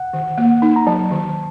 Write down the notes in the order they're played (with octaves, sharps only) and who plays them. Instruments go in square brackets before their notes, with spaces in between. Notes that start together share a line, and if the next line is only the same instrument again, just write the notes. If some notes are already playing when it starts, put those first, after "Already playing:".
Already playing: [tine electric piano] F#5
[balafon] D#3
A#3
D#4
[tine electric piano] A#5
[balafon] F#3 [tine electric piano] A5
[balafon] D#3